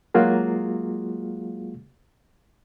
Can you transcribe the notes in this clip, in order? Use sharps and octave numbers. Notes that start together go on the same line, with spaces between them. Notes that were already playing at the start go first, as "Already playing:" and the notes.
F#3 G#3 A#3 F4 F#4 G#4